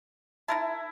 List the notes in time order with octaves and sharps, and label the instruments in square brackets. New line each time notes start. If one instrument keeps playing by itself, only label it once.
[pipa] D#4 A#4 A5 [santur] E4